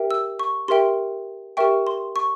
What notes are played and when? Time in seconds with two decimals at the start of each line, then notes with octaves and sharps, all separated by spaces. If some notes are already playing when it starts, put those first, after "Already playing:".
Already playing: G4 A#4 E5 G5
0.11 E6
0.39 C#6
0.68 G4 A#4 E5 G5 C6
1.57 G4 A#4 E5 G5 C#6
1.87 C6
2.16 C#6